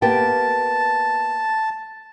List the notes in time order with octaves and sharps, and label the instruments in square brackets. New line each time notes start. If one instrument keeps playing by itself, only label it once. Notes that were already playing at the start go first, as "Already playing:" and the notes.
[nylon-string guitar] A#3 B3 G4 [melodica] A5